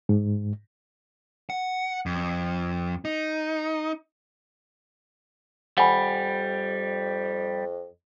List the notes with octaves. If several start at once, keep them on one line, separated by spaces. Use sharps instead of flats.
G#2
F#5
F2
D#4
F2 G3 F#5 G#5 B5